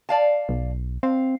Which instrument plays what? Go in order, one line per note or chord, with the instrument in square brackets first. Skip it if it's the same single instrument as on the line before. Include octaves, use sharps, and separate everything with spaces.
[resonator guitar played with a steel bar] D5 F5 A5
[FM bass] B1
[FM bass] C4 [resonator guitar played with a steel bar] F5